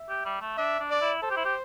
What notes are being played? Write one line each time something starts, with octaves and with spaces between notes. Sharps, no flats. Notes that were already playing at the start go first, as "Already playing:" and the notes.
Already playing: E5
G4
G3
A3
D4 E5
D4
D5
E4
A4 C5
G4
E4
G4